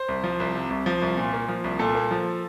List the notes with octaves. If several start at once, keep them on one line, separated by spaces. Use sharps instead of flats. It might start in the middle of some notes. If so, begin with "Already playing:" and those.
Already playing: C5
C2
F3
C2
C3
C2
F3
C2
A#2
A#3
F3
C2
A#2 A4
A#3
F3